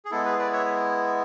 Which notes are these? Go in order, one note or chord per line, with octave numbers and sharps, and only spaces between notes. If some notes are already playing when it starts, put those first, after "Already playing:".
G#4
G#3 B3 E4 A4
G#4 B4
B4 D5
C#5 E5